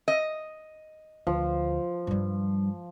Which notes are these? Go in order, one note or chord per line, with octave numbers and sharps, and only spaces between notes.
D#5
D2 F3
G2 G3